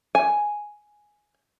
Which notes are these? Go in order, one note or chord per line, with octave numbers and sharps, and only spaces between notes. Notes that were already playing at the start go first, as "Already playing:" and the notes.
G#5